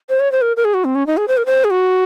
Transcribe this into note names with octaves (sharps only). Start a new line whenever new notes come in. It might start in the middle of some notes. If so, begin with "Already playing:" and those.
C5
C#5
C5
A#4
A#4
G#4
F#4
C4
C#4
D#4
G#4
C5
A#4
C5
G#4
F#4